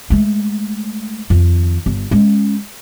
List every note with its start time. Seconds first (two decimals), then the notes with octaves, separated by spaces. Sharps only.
0.10 G#3 A3
1.30 F2 D#3
1.86 G1
2.11 G#3 C#4